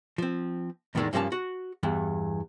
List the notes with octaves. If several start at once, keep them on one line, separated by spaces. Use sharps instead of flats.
F3 C4
E2 A2 D3 D#3 G#3 D4
G2 F3 G3 A#3 C#4 A5
F#4
E2 G2 E3